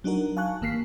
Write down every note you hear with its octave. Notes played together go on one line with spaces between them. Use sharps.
F#3 D4 D#4 F#4 A#4
F5 G#5 A5 C#6 F#6
G1 D#3 A#3 F6 B6 C7